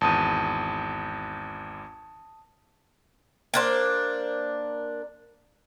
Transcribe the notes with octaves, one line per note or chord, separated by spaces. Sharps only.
G#1 E2 A5 D#6 D#7
A#3 D4 C5